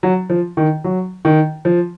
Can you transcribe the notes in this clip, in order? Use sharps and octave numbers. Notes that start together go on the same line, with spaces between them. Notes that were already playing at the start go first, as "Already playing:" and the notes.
F#3
F3
D#3
F#3
D#3
F3